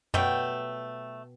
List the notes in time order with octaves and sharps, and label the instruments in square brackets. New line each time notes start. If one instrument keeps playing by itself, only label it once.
[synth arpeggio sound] F#2 [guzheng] B2 [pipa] F#3 G3 A3 [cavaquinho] G5